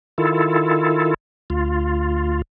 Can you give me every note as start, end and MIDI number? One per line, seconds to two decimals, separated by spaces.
0.18 1.14 51
0.18 1.14 64
0.18 1.14 65
0.18 1.14 69
1.50 2.42 38
1.50 2.42 65